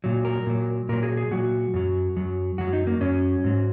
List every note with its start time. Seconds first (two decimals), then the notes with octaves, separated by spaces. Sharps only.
0.04 A#2 F#3
0.25 A#4
0.47 A#2 F#3
0.89 A#2 F#3 A#4
1.03 G#4
1.17 G#4
1.31 A#2 F#3 F#4
1.74 F#2 F#3
2.16 F#2 F#3
2.58 F#2 F#3 F#4
2.73 D#4
2.87 A#3
3.01 F#2 F#3 C#4
3.44 G#2 F#3